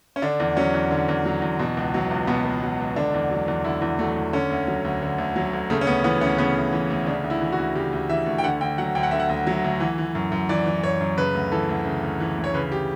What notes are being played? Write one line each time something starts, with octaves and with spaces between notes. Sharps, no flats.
C#4
D3 D4
E2
F#3 C#4
E2
D3
E2
F#3
E2
B2
C#2
F#3
C#2
B2 B3
C#2
F#3
C#2
D3 D4
E2
F#3
E2
D3 E4
E2
F#3 A3
E2
D3 C#4
D2
F#3
D2
D3
D2
F#3
D2
C#3 A3
C#4
D2 B3
E3 B3
D2 C#4
C#3 B3
D2
E3
D2
C#3 D4
D2
E4
E3
F#4
D2
C#3 G4
D2
E3 E5
D2
G5
D3 F#5
D2 G5
F#3 F#5
D2 G5
F#5
D3 E5
F#5
D2
F#3
D2
E3
E3
F#2
F#2
E3 D5
E3
F#2 C#5
F#2
C#3 B4
D2
E3 A4
D2
C#3
D2
E3
D2
C#5
C#3 B4
G4